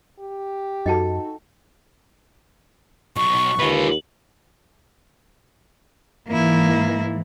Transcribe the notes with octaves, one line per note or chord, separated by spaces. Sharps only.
G4
F#2 D#4 F#4 A4 D#5 G5 A5
B1 C#6
D#2 F4 B4
G#2 E3 A#3 E4